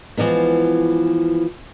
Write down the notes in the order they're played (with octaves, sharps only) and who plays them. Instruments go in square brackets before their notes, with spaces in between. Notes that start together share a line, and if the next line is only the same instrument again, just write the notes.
[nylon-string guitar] E3 F3 G#3 B3